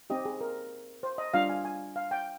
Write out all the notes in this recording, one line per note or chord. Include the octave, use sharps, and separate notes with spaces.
C4 D#4 G4 D#5
G#4
A#4
C5
D#5
G3 D4 F4 F5
G#5
G#5
F5
G5